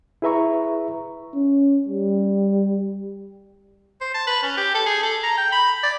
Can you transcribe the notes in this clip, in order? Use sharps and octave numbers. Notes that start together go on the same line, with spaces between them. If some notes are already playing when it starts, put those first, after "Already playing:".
E4 G#4 B4 E5 A#5 C#6
C#4
G3
C5
A5
B4
C#4
G4
A4
G#4
A4
A#5
G5
B5
D5